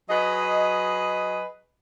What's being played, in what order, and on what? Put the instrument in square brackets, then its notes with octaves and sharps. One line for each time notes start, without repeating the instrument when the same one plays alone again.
[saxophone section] F#3 G#4 B4 D#5